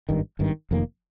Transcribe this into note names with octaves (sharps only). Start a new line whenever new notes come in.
G#1 G2 D#3
G#1 G2 D#3
F1 F2 D#3 A#3